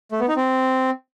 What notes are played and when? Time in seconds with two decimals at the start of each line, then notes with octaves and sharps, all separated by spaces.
0.12 A3
0.20 B3
0.28 D#4
0.36 C4